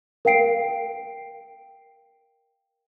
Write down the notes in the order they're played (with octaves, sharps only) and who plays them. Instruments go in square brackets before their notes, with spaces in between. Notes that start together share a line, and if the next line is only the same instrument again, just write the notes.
[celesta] A#4 F5 G5 C7 D7